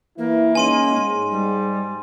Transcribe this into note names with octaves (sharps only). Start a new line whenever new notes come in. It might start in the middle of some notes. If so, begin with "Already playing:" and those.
E3 A#3 E4
G#3 C#4 D#4 G#5 C6 D#7
G#2 C6
G3